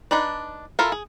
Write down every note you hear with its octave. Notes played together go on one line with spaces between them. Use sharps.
D4 D#4 B4 D5
E4 F4 A4 A#4 F5
G#4